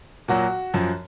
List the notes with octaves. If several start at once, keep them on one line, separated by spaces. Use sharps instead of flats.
A#2 F#3 F#4
F#2 F3